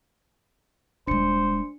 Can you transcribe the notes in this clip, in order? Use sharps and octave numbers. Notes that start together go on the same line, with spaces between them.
D#1 G#3 D4 C5 C#7